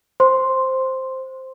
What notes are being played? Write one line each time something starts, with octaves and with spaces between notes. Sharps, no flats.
C5 C6